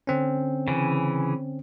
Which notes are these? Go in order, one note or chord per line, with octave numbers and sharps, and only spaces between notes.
D3 C4 C#4
C#3 E3